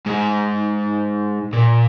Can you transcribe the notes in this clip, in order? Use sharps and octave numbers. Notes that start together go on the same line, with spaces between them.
G#2
A#2